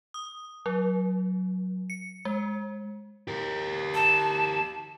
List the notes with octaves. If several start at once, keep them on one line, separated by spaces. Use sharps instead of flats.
D#6
F#3
C#7
G#3
G4 A#4
A5